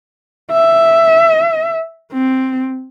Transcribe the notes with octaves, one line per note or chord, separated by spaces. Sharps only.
E5
C4